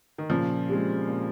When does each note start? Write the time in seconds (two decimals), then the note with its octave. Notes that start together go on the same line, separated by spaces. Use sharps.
0.18 D#3
0.30 A#2 C#3 F3
0.69 G#3 C4 G4
1.07 A#2